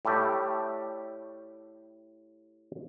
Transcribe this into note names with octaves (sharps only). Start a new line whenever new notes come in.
A2 G3 A3 G4